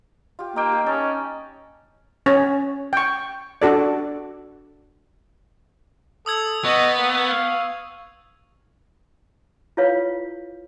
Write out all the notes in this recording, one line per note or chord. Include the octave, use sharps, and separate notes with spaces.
F4 G4
A#3 D#4 G5 E6
G4
C#4 D#4 A5
C#4 C#5
G5 C#6
D4 F#4 A4 D5
A4 D#6 E6 G#6
B3 D#5 C#6
A#3
F5
E4 F4 B4 C#5 F5